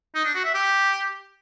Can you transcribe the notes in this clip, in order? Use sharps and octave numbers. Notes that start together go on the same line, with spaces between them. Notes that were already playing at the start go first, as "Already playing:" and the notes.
D#4
D4
F#4
E5
G4